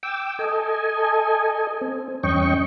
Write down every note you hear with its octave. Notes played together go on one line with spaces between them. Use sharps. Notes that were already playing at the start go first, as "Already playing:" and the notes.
G5 D6 E6
A4 D#5 G#5
C4
E2 G2 C#4 D#5 G5 C#6